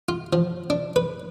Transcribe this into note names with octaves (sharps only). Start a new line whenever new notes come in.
F4
F3
D4
B4